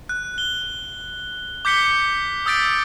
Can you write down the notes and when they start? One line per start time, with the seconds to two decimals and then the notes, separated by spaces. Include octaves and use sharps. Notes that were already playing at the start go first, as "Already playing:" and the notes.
0.09 F#6
0.38 G7
1.65 D6 G6 B6 C#7 G7
2.46 D#6 E6 G6 A6 B6 D7